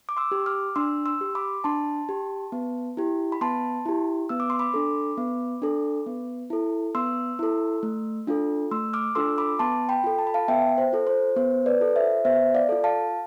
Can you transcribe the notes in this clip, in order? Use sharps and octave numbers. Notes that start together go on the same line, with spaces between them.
D6
C6 E6
G4
D6 F6
D4 C6 E6
C6 E6
G4
B5 D6
D4 A5 C6
G4
B3
E4 G4
B5
B3 A5 C6
E4 G4
B3 E6
D6
C6
B5 D6
D4 A4
B3
D4 A4
B3
E4 A4
B3 C6 E6
E4 A4
A3
D4 F4 A4
A3 C6 E6
D6 F6
D4 F4 A4 C6 E6
B5 D6
B3 A5 C6
G5 B5
F4 A4
A5
B5
F5 A5
B3 E5 G5
C5
F4 A4
C5
B3 C5
B4 D5
F4 A4
C5 E5
B3 C5 E5
D5 F5
F4 A4
F5 A5